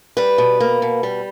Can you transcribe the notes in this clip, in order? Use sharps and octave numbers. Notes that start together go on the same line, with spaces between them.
G3 B4
B2
A#3
B2
G3